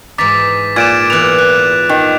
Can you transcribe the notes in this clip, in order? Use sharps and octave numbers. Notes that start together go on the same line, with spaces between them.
G#2 E3 D#4 D6 A6 B6
A#2 G#6 D7 E7
E3 B3 F#6 F7
F#6
D#3